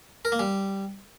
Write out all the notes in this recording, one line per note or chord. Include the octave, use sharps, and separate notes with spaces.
A#4
A#3
G3